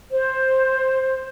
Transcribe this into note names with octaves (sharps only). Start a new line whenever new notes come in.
C5